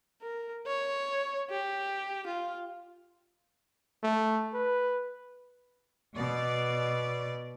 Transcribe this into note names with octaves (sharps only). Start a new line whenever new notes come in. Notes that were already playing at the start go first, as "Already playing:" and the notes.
A#4
C#5
G4
F4
A3
B4
B2 D5